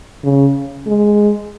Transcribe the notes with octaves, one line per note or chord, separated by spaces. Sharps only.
C#3
G#3